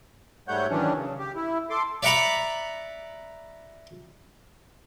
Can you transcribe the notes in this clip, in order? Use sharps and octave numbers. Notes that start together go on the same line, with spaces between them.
G#2 G3 A3 C#5 F#5 G6
D#3 E3 F#3 C#4 D4
C#3
G4
E4
A4 C6 D6
D5 E5 F#5 A#5 B5